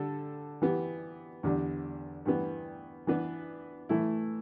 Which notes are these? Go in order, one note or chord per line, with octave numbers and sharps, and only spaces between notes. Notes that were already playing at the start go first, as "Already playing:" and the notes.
Already playing: D3 G3 D4 A4
E3 B3 G4
E2 D3 G3 D4
G2 E3 B3
E3 B3 D4 B4
E3 A3 E4